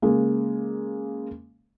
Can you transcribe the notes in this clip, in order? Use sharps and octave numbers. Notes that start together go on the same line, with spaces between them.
C#3 G#3 A#3